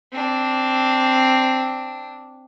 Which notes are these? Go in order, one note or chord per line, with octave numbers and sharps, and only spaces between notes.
C4 D4